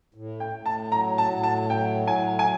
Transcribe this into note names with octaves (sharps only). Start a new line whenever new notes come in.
A2
G5
A2
A5
F#3 A#5
A5
A2
A5
F#3 G5
A2 G#5
G#5